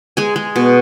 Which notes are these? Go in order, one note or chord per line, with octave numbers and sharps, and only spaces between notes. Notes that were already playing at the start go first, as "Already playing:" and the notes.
G#3 G#5
G#3
B2